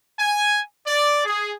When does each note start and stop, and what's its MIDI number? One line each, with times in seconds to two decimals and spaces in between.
0.20 0.61 80
0.87 1.21 74
1.25 1.53 68